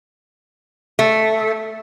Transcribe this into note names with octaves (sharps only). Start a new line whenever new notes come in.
A3